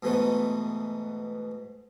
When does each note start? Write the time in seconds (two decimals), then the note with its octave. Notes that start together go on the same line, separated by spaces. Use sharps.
0.03 G#2 B2 E3 A3 B3 D#4